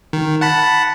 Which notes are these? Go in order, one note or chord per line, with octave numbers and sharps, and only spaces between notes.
D#3
F#5 A5 B5